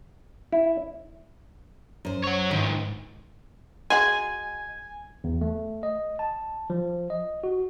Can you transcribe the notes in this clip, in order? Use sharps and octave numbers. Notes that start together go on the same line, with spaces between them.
E4
F#2 C5
F#4 C#5
G#2 D#3 F3
G#3 F#4 G#5
E2
A3
D#5
A5
F3
D#5
F#4